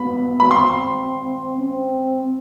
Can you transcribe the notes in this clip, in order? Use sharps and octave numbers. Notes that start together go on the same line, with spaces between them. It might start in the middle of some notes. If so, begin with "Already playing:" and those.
Already playing: B3 B5
B3 B5
C4 C6
C#4
C4